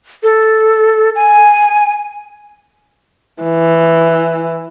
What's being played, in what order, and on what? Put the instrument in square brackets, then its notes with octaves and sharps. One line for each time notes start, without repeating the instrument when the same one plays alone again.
[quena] A4
G#5
[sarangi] E3